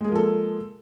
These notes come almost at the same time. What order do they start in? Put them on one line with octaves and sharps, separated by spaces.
G#3 G#4 A#3 F3 A4